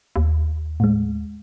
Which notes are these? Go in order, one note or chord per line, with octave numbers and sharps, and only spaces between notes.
D#2
A2 G#3